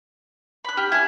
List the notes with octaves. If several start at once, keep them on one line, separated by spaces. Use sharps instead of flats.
B5 F#6
G4 F6
E4 G#5 G#6